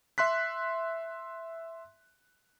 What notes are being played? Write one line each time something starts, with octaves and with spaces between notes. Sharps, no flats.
E5 C6 F#6 B6